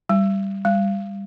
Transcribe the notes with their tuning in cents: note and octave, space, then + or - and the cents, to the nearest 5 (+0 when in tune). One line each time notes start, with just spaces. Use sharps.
G3 +0
G3 +25